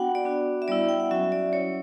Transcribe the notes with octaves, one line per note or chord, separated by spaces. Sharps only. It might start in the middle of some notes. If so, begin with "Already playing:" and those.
Already playing: B3 D4 F#4 F#5 G5
D5
B3 D4 F#4
E5
G3 B3 E4 D5
G5
F#5
F#3 C#4 F#4 E5
D5
F#3 C#4 E4 C#5